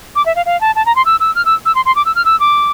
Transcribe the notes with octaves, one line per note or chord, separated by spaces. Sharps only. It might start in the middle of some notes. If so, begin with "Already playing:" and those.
D6
E5
F5
F5
A5
A5
A#5
C6
E6
E6
F6
E6
E6
C6
C6
D6
E6
F6
E6
D6